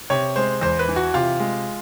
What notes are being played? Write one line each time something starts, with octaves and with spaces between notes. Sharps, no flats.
C3 C#5
G#3 C5
E2 C5
B4
E3
F#4
C3 F4
G#3